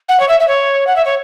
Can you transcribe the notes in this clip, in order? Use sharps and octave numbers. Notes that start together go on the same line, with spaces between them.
F#5
C#5
E5
E5
C#5
F#5
E5
C#5